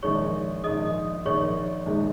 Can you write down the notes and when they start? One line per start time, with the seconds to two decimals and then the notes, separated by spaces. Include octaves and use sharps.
0.03 A#1 G#2 D#3 G#3 C#5 C#6
0.64 A#1 G#2 D#3 G#3 D#5 D#6
1.25 A#1 G#2 D#3 G#3 C#5 C#6
1.86 A#1 G#2 D#3 G#3